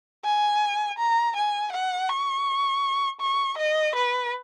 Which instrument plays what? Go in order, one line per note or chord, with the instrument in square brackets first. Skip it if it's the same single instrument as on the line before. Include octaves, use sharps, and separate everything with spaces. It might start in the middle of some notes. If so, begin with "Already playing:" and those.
[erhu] G#5
A#5
G#5
F#5
C#6
C#6
D#5
B4